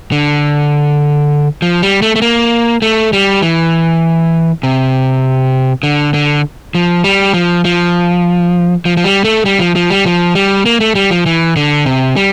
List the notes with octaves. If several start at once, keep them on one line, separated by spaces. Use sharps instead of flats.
D3
F3
G3
A3
A3
A#3
A3
G3
E3
C3
D3
D3
F3
G3
F3
F3
F3
F3
G3
A3
G3
F3
F3
G3
F3
G3
A#3
A3
G3
F3
E3
D3
C3
G3